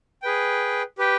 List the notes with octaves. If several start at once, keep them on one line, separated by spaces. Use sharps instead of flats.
G#4 B4 G5
G4 B4 G5